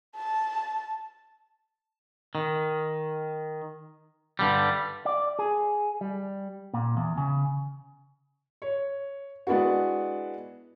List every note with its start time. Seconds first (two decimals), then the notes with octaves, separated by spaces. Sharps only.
0.16 A5
2.35 D#3
4.39 G2 D3 G3
5.05 D5
5.39 G#4
6.01 G3
6.74 A#2
6.97 E2
7.17 C#3
8.62 C#5
9.47 G#3 B3 D4 E4 F#4